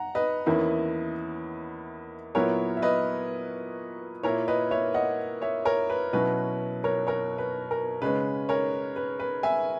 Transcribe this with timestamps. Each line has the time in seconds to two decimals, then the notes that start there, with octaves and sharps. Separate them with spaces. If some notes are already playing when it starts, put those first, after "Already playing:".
Already playing: F#5 A#5
0.15 B4 D#5
0.46 E2 D#3 A#3 C#4 E4
2.35 A#2 F#3 B3 E4 A#4 C#5
2.77 E5
2.82 B4 D#5
4.23 A#2 A#3 E4 A#4 C#5
4.48 B4 D#5
4.71 C#5 E5
4.94 D#5 F#5
5.42 C#5 E5
5.65 A#4 C#5
5.90 B4
6.13 B2 F#3 C#4 E4 B4
6.84 A#4 C#5
7.07 A#4 C#5
7.38 B4
7.71 A#4
8.02 C#3 G#3 C#4 B4
8.49 A#4 C#5
8.96 B4
9.20 B4
9.43 E5 G#5